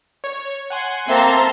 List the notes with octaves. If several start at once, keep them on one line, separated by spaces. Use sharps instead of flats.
C#5
F#5 G#5 C6
A#3 C4 A4 E5 A5 A#5 C6